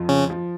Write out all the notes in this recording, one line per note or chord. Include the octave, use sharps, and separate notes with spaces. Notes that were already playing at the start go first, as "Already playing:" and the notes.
Already playing: F2 F3
C#3 C#4
F3